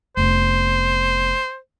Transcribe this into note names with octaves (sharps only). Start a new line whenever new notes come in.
F1 B3 C5